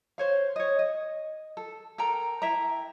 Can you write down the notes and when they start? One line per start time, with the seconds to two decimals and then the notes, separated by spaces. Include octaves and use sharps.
0.18 C5 C#5 F5
0.56 C#5 D#5
0.79 D#5
1.57 A4
1.98 A4 A#4 G5 A#5
2.42 E4 E5 G5 A#5